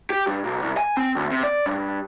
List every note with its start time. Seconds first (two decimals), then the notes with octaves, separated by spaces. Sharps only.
0.10 G4
0.27 G2
0.45 B1
0.62 C2
0.77 G#5
0.97 C4
1.16 D2
1.32 C3
1.43 D5
1.66 G2